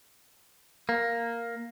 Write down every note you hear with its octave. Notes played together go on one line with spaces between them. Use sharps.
A#3